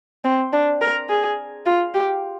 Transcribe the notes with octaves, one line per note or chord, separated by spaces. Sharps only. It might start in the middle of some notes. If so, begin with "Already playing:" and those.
C4
D4
A#4
G#4
F4
G4